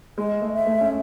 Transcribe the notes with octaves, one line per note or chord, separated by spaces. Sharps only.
G#3 D#5
A3
E5
A3
C#4